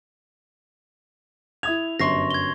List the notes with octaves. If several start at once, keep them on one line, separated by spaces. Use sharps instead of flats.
E4 D#6 G#6 F7
G1 F#2 C6 C#6 A#6 C7
G#6 G7